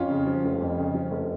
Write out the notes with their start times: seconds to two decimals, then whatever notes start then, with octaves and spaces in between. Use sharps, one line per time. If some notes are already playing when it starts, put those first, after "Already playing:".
Already playing: F2 C#4 F4
0.10 C#3
0.27 F3
0.44 F1
0.61 F2
0.78 C#3
0.94 F3
1.11 F1